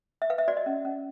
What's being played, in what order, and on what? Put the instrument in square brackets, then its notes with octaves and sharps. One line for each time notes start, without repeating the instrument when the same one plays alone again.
[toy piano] E5
B4 F5
E5
F#4 D5
D#5
C#4
C#4